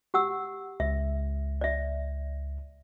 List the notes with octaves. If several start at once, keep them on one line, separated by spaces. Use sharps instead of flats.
G4 F#5 E6
C#2 E5
D5 E5